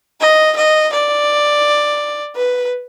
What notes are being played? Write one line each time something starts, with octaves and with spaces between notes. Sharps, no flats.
D#5
D#5
D5
B4